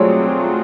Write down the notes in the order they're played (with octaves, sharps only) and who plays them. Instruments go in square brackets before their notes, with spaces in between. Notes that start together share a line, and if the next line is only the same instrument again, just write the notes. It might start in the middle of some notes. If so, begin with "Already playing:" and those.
Already playing: [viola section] F#3 A3 C4 F4 G#4 [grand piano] C#5 D5